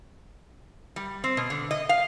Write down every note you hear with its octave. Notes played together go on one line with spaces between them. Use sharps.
G3
C4
B2
D3
D#5
F5